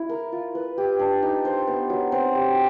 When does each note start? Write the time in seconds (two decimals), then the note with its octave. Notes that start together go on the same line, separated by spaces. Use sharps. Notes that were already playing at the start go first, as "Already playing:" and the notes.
Already playing: E4
0.09 A#4
0.32 F4
0.55 B4
0.78 G4
0.99 D4
1.22 D#4
1.45 C5
1.67 B3
1.90 F#3
2.12 C4
2.35 G4